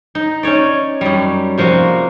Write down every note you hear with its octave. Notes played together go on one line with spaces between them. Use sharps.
D#4
C#4 D#4 C#5 D5
F#2 G3
C3 F3 A#3 F#4